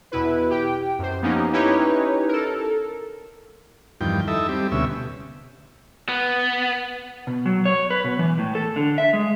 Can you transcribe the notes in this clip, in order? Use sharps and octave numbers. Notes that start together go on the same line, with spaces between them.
E2 B2 E4 B4
G4 G5
F#2 C5
F3 A#3 B3 C#4 D#4 G4
C#4 D#4 E4 G4 B4 C#5
A4 A#4
E2 G2 D#3 F3 G5
D#4 E4 A4 E5
G3 C4 G4
D2 B2 C#4 E5
B3
B2
F#3
C#5
B4
B2
E3
A2
A4
D3
E5
G#3